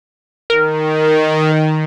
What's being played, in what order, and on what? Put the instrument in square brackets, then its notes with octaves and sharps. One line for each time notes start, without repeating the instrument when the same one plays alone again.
[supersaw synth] D#3 [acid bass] A#4